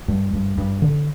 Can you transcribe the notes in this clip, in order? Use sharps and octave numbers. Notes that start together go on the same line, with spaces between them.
G2
G2
G2
D3